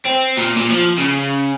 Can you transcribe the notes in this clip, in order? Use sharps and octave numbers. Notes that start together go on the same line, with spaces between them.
C4
A#2
A#2
F3
C#3